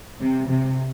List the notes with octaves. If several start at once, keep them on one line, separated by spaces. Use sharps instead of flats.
C3
C3